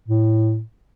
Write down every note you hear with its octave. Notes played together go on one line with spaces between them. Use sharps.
A2